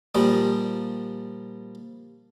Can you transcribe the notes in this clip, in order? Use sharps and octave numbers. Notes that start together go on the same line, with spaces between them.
A#2 F3 G3